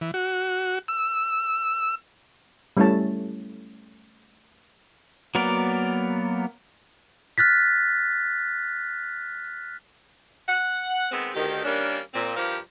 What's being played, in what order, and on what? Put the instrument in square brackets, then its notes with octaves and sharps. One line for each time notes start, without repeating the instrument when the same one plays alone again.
[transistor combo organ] E3
F#4
E6
[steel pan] G3 A3 C#4 E4 C#5 A5
[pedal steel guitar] F#3 A#3 B3 A#4 D5
[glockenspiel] F6 F#6 A6 B6
[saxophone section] F#5
D#3 G#3 B3 C4
D2 D#3 G4
D#3 G3 A#3 C#4 D4
A#2 C4
G2 F3 G4 A#4 C5 F5